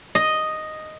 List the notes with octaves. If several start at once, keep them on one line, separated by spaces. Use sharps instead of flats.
D#5